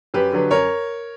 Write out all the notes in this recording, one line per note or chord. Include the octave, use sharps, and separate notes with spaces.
F#2 G4 B4
D3 F#3 B3
F#2 A#4 C#5